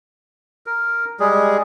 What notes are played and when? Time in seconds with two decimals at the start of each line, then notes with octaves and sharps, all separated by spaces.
0.66 A#4
1.20 G3 G#3 G#4